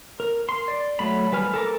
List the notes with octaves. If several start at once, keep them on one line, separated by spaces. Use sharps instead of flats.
A#4
C6
D5
F#3 A3 B5
G3 B4 G#5 F6
A4 A#4 D6